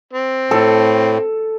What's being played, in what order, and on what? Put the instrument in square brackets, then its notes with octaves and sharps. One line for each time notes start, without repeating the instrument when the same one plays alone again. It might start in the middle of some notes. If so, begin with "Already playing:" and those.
[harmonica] C4
[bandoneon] A2 [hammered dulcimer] A4